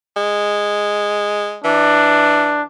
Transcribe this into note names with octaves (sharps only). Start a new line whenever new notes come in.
G#3
E3 D4